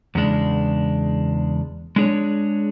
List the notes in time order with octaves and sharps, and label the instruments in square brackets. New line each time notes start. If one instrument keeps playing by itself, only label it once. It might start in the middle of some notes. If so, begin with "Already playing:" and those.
[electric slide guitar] E2 C#3 G#3 D4
G#3 D4 G#4 C#5